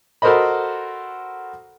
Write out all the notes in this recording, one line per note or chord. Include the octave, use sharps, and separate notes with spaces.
F#4 A4 A#4 C5 D#5 B5